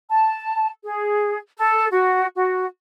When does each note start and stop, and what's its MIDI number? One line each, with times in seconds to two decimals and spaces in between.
0.10 0.69 81
0.84 1.37 68
1.57 1.86 69
1.92 2.26 66
2.35 2.64 66